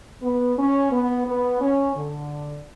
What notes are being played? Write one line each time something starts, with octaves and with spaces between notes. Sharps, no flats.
B3
C#4
B3
B3
C#4
D3